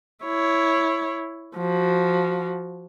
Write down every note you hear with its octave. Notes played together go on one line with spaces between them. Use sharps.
E4 C#5
F3 F#4